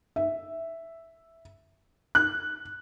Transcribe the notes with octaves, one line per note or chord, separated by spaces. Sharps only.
E5
F#6